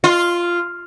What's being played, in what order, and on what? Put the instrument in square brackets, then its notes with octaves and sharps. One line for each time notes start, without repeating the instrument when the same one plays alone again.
[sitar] F4